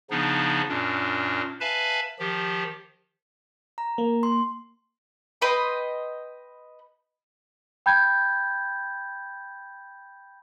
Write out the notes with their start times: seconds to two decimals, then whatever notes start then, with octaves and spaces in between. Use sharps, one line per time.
0.11 C#3 F3 B3 D4 D#4
0.69 F#2 A#2 D4
1.60 B4 E5 F5 G#5 A5 B5
2.19 D#3 F3 G4
3.78 A#5
3.98 A#3
4.23 C6
5.42 B4 D#5 G5 C6
7.86 G5 B5 G6 G#6